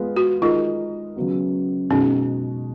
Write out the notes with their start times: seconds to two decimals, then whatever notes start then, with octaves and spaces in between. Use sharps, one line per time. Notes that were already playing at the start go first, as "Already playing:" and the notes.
Already playing: G#3 B3 F4 B4
0.17 F#4
0.42 G#3 D#4 F4 A#4 D#5
1.16 C#3 F#3 B3 F#4
1.90 B2 G#3 C#4 D#4 F#4